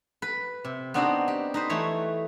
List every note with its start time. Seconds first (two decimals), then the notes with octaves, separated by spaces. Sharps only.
0.22 B4
0.65 C3
0.94 B3 C4 D4 D#4 F#4 C5
1.28 G4
1.54 D#4 B4 C5
1.70 E3 A3 C#5